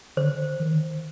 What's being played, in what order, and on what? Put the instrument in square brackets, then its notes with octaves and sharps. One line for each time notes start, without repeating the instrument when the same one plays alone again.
[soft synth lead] D3 [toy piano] C5
[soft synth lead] D#3